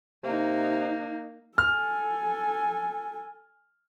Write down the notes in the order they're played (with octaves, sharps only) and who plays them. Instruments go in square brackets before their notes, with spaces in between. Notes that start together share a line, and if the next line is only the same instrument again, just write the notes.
[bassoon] C3 [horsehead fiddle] A#3 D#4
[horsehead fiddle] A4 G#5 [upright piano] F6